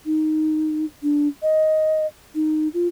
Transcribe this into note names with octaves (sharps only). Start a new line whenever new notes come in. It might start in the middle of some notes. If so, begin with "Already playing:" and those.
D#4
D4
D#5
D#4
F4